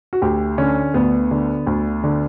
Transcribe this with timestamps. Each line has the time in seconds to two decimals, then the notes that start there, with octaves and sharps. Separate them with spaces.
0.13 F#4
0.22 D2 G4
0.58 D3 C#4
0.94 D2 B3
1.31 D3
1.67 D2
2.04 D3